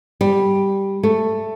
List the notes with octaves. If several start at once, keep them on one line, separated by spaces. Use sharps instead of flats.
G3
A3